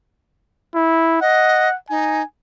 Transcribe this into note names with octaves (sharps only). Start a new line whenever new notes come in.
E4
D#5 F#5
D#4 G#5